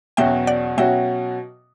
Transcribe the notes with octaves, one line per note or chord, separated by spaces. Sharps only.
E2 B2 F#3 C#4 F#4 E5 G5
D5 F#5
B2 F#3 C#4 F#4 E5 G5